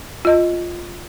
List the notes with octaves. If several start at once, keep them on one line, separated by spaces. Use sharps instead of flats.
F4 D#5